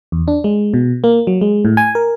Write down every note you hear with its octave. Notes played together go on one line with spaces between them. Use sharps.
E2
D4
G#3
B2
A#3
F#3
G#3
A2
G#5
A#4